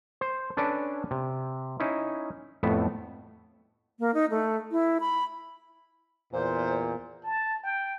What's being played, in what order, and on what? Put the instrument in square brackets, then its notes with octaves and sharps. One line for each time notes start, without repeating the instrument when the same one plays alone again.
[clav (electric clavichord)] C5
C#4 D4 A4 B4 D5
C3
C#4 D#4 E4
F2 A2 A3 B3 E5
[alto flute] A#3
D#4
A3
E4
B5
[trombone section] E2 A#2 [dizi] C5
[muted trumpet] A5
G5